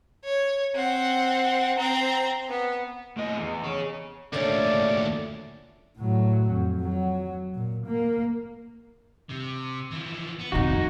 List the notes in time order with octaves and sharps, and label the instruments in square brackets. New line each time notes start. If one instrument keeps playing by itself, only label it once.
[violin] C#5
C4 F#5
C4 A#5
B3
[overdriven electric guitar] A2 D#5
E2
G#4 C#5
[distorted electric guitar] D2 A#2 [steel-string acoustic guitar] A3 C#4 D4 [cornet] D5
[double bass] A2 F#3
F2
F#3
A#2
A#3
[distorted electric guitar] C3
E3 F3
B3
[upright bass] D#1 F2 [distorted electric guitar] A#2 [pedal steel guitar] D#4 F#4